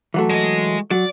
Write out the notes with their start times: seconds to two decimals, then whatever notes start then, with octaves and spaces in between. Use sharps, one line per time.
0.14 E3 F#3 A3
0.30 G#3 D#5
0.91 F#3 D5